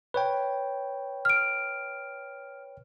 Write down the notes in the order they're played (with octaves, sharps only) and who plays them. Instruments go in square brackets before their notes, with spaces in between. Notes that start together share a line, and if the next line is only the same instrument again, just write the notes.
[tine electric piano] B4 C#5 G5
[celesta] F6 D7